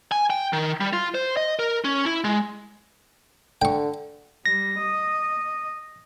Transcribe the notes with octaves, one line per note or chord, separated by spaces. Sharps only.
G#5
G5
D#3
G3
F4
C5
D#5
A#4
C#4
E4
G#3
D3 G5 C#6
G3 A#6
D#5